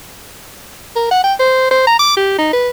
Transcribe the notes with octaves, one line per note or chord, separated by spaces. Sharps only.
A#4
F#5
G5
C5
C5
A#5
D6
G4
D#4
B4